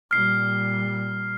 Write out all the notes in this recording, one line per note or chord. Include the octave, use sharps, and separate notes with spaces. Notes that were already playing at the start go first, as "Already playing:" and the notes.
A#2 G3 F6 C7